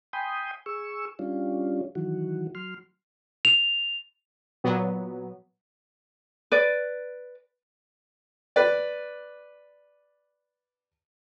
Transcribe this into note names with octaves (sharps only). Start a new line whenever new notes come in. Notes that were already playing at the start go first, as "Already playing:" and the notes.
G5 G#5 B5 C6 D#6 G6
G#4 C#6 E6
G3 C#4 D4 F4
D#3 E3 F#3 F#4
F#3 C6 F6
F7
A#2 F#3 B3
B4 D5
B4 D5